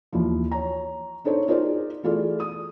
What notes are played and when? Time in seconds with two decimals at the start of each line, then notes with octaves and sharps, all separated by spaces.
0.13 D#2 E3 F3
0.51 C#5 A#5
1.24 D4 D#4 A4 C5 C#5
1.48 D#4 F4 G#4 A#4 C5 D5
2.03 E3 A3 F4 G#4 D5
2.40 D#6